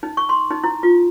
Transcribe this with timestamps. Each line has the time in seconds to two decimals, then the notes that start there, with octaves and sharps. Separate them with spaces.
0.03 D#4
0.17 C#6
0.29 C6
0.51 D#4
0.64 E4
0.83 F4